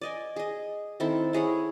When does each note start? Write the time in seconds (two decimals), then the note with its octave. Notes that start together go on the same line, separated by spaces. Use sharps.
0.01 D5 D#5 G#5
0.36 G#4 D#5
1.00 D#3 C4 E4 A4
1.33 E4 G#4 C#5 F#5